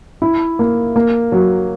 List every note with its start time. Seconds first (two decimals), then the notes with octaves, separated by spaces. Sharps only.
0.22 E4
0.59 A#3
0.96 A#3
1.32 F#3